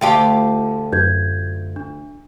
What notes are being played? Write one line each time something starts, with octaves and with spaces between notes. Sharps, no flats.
D2 F4 G4 G5 A5
F#2 G6 G#6
D4